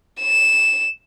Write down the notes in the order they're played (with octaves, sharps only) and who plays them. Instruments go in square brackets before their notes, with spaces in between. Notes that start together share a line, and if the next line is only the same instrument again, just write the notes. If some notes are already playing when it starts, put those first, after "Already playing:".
[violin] E7